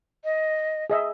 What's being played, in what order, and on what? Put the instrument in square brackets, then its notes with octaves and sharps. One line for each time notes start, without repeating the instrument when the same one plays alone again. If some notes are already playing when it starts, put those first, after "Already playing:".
[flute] D#5
[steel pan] G#4 D#5 E5